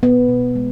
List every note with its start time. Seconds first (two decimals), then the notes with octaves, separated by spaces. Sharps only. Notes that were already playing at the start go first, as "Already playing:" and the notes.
0.03 B2 B3
0.29 B2
0.55 G#3